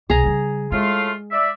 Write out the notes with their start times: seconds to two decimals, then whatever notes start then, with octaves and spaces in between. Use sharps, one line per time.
0.10 C2 B2 G#4 A#5
0.24 C#3 G3
0.72 A2 G#3 A3 F4
1.32 D5 E5